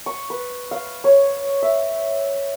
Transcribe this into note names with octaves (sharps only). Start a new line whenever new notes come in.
C#6
B4
F5
C#5
E5